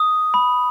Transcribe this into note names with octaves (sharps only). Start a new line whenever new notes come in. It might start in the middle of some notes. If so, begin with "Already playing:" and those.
Already playing: D#6
B5